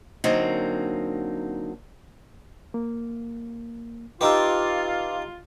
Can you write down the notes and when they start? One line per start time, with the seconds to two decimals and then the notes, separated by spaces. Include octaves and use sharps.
0.24 D3 F#3 A#3 C4 D#4
2.74 A#3
4.21 D4 D#4 F4 G4 B4 D6 E6